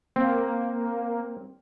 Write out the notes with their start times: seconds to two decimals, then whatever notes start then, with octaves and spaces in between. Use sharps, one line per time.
0.16 A#3 C4